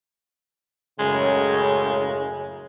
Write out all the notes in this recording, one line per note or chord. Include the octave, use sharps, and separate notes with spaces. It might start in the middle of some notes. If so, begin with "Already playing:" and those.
F#2 A2 C#3 G#3